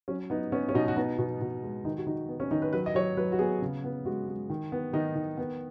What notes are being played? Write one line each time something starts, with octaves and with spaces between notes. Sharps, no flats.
F#3 C#4
B3 D#4
B3 C#4
C#4
B2 D#4
F#4
B3 D#4
B2
B2
G#3
D#3 D#4
F#4
D#3 D#4
B3
C#4
D#3 D#4
B4
F#3 B4
D#5
F#3 C#5
F#3 B4
F#4
B3 G#4
C#3
B3
G#3 F#4
G#3
D#3
B3
D#3 D#4
D#3
B3